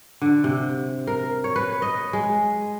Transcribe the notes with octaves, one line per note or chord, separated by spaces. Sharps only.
D3
C3
A#4
C#5
B4
D#5
G#3